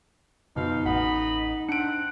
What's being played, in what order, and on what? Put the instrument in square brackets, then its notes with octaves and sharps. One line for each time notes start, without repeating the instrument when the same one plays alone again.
[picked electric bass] F2 [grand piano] B2 [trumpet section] C4 F5 [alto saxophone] D#4
[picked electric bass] A1 [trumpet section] D#5 B5 [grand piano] F#5
[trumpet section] C4 F#5 [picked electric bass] D4 [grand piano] C#7 D7